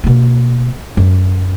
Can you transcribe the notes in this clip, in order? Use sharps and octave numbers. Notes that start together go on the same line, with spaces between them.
B2 A#3
F#2 F#3